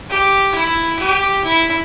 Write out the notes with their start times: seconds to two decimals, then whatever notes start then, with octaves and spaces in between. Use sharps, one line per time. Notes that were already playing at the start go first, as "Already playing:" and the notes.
0.11 G4
0.55 E4
1.00 G4
1.44 E4